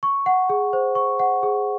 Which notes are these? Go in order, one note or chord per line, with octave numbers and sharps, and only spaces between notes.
C#6
F#5
G#4
C5
C#6
F#5
G#4